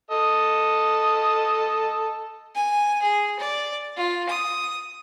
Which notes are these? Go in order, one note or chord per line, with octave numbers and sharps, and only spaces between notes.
A4 D#5
G#5
G#4
D5
F4
D#6